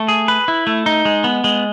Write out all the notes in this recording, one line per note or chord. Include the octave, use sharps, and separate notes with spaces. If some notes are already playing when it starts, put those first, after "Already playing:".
Already playing: A3
G#4
B4
E4
A3
D#4
G#3
B3
G#3